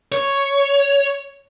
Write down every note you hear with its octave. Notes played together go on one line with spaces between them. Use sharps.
C#5